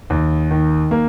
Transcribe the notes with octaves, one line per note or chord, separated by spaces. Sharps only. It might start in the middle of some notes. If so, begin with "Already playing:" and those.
D#2
D#3
A#3